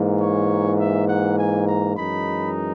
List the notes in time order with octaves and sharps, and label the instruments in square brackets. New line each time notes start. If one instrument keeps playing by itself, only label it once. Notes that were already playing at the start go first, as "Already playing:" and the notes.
Already playing: [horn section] G#2 E3 A#3
C#5
E5
F#5
G#5
A#5
F#2 E3 G#3 D#4 B5